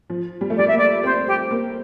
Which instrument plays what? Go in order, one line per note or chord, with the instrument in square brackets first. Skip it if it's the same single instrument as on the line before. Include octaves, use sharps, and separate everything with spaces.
[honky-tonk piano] F3
G3
A3
[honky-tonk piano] G3 [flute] D5
[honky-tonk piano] A#3 [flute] E5
[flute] D5
[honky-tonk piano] C4 [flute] C5
[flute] G4
[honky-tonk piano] A#3